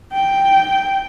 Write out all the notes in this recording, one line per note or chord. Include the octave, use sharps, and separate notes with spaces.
G5